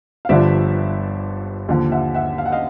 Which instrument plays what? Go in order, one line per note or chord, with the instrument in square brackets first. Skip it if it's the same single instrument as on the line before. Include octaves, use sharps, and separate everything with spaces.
[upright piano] F5
G1 G2 D3 F3 D5 E5
D#2 D3 F3
E5 F#5
E5 F#5
F5
F#5
D#5 F5